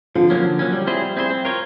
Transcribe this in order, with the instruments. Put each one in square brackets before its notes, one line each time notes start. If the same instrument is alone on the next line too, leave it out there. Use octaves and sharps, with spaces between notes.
[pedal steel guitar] D3 [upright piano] F3
[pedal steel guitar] F#3 A#3 C#4
D3
F#3 A#3 C#4
G3
C4 E4 G#4 C5
G3
C4 E4 G#4 C5
C4
F4 A#4 C#5